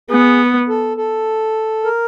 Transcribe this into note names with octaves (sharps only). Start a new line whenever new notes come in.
B3 G#4
A4
A4
A#4